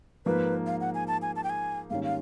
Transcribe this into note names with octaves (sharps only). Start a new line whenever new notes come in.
G#2 F3 A#3 B4
F5
F#5
G#5
A5
G#5
A5
G5
G#5
G#2 D#3 G3 A#3 C#4 F5
F5